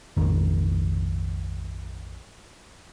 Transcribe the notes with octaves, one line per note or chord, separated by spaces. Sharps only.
A#1 F2 G#2 D#3